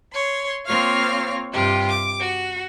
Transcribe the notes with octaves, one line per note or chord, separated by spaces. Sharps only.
C#5 C6
A#3 C4 F4 C#5 F5 F6
G2 C3 F4 G4
D6
F#4